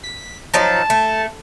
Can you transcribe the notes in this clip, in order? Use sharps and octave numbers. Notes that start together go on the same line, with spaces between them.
B6
F3 F#3 D#4 A5
A3